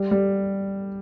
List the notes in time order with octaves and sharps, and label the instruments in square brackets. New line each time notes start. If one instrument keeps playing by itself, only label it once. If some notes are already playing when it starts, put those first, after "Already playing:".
Already playing: [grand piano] G3
G3